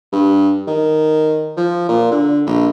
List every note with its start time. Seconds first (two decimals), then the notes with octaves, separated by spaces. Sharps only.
0.12 G2
0.67 D#3
1.57 F3
1.89 A#2
2.11 D3
2.46 A#1